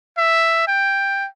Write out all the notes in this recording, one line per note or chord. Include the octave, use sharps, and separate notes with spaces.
E5
G5